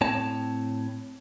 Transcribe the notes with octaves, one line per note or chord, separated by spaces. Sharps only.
A2 C4 C#5 A5